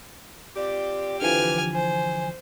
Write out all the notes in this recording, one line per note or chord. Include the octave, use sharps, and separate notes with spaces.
C4 F4 G4 D5
D3 E3 F3 B4 G#5 F6
C5 G#5